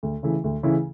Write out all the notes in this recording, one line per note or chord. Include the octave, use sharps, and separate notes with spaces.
D2
C#3 E3 A3 E4
D2
C#3 E3 A3 E4